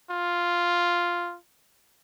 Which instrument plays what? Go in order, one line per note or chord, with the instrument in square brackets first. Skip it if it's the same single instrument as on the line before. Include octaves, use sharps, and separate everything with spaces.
[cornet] F4